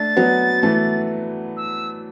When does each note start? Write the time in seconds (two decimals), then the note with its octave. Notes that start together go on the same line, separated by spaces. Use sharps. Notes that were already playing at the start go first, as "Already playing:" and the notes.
Already playing: A3 D4 A6
0.17 F#3 B3
0.63 E3 A3
1.57 E6